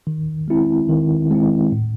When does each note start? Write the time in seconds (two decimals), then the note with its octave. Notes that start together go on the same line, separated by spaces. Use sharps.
0.07 D#3
0.48 G#3 C4 E4
0.89 D#3
1.30 G#3 C4 E4
1.71 A2